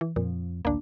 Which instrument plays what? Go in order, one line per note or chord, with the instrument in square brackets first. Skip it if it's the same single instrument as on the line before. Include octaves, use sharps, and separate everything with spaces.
[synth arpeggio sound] E3
[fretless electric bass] F2 F3 [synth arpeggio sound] A#2
[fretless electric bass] A1 D2 [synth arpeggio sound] A#3 D4